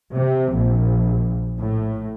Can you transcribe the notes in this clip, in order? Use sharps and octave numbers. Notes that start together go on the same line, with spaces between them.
C3
A#1
A2